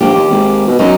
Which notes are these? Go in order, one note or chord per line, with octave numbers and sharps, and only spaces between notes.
A#1 A#3 G4
D#2
G#1
B2
F#2 D#4